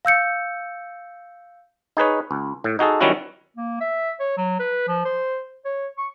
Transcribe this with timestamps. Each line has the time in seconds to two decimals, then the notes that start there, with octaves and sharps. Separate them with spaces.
0.05 F5 E6 G6 C#7
1.97 D#4 G#4 B4 C#5
2.31 C#2
2.64 A2
2.79 D#4 F#4 G#4 A4
3.01 D#3 F#3 G3 C#4 E4 F#4
3.57 A#3
3.81 E5
4.20 C#5
4.37 F#3
4.60 B4
4.88 F3
5.05 C5
5.65 C#5
5.98 C#6